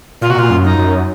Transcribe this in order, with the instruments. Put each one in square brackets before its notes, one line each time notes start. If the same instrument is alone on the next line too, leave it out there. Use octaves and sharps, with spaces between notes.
[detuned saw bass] A#2 [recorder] F4
[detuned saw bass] C3 [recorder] F#4
[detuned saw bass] A#2 [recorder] F4
[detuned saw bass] F#2
[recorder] D#4
[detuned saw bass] F#2